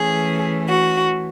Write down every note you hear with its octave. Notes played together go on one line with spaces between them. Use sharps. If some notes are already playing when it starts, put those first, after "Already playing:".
Already playing: E3 A3 C#4 G#4
F#4